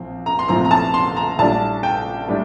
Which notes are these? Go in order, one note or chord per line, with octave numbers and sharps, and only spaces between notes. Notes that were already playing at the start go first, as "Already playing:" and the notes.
Already playing: A#1 A2 F3 C4
A#5
C6
A#1 A2 F3 C4 A#5
A#5
A5
C6
A#5
A#1 A2 G3 D4 A5
G5
A2 G3 D4